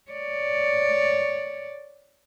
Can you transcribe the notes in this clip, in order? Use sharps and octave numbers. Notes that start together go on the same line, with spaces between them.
C#5 D5